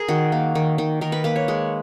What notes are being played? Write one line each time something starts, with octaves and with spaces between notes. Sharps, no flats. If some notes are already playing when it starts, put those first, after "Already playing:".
Already playing: G#4 A#4
D#3 F#4
A#3
D#3
D#3
D#3 A#4
B4
A#3 B4
C#5
G#3